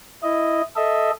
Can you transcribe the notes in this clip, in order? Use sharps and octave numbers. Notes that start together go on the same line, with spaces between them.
E4 D#5
A4 D#5 E5